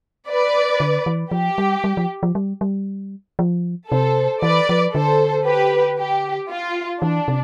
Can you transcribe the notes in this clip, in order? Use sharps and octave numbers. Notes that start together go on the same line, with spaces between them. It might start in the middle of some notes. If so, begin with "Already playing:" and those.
B4 D5
D3
E3
F3 G4
G3
G3
F3
F3
G3
G3
F3
C3 A4 C5
E3 B4 D5
F3
D3 A4 C5
G4 B4
G4
F4
E3 D4
C3